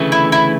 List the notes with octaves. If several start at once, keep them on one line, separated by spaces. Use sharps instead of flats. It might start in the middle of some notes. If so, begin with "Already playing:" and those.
Already playing: D2 C#3 E3 A3
E4
E4